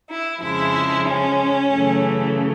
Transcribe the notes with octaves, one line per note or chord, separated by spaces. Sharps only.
E4
F2 C#3 F3 G#3 E4
C#4
F#2 C#3 E3 A3